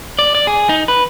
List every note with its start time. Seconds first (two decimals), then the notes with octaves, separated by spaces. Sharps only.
0.19 D5
0.35 D5
0.47 G#4
0.69 D#4
0.88 B4